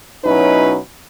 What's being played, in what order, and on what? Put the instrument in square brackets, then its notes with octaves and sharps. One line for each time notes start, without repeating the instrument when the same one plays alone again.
[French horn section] B2 F#3 C#4 D#4 E4 B4